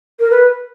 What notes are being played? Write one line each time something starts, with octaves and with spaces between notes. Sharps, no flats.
A#4
B4